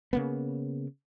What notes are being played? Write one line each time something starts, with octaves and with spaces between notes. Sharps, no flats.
C#3 A#3 B3